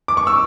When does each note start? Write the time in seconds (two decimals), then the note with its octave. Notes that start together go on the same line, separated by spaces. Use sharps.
0.08 D6
0.17 C#6
0.27 E6